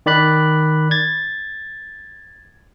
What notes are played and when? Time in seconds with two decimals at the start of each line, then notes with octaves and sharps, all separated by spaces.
0.06 D#3 D5 B5 F#6
0.91 G#6 A6